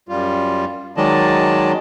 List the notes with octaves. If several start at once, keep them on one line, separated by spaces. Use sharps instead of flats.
F#2 G3 F4
D#3 F#3 G#3 D5 D#5 A5